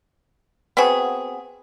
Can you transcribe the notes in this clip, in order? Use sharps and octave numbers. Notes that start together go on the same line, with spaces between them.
B3 C4 F#4 G#4